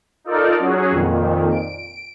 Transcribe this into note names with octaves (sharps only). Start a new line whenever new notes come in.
D#4 F4 A4 A#4 D5
F#3 C#4 F#4 G#4
F2 A#2 D#3
D7